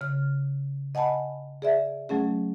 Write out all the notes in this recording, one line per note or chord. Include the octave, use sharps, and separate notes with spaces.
C#3 F6
D#5 F#5 G#5 A5 B5
G#4 D5 E5
F#3 A3 C#4 G#4